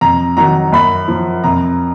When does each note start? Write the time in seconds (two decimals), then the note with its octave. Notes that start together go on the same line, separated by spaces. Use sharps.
0.01 F2 A#5
0.37 D#3 F#3 A#5
0.73 F#2 B5
1.08 F3
1.44 F2 A#5